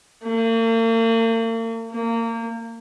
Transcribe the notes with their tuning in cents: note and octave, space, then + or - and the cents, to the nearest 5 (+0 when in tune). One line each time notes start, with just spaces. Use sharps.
A#3 -45
A#3 -25